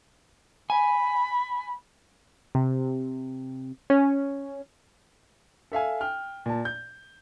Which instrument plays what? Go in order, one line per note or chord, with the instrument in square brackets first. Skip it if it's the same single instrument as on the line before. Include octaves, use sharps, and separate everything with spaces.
[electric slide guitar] G#5 [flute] B5
[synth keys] C3
C#4
[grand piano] A4 E5 F5 G#5
G5 F6
A#2 A5
G6